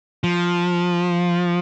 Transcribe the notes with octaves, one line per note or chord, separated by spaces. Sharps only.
F3